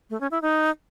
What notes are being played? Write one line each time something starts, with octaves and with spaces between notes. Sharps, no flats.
A3
C#4
E4
D#4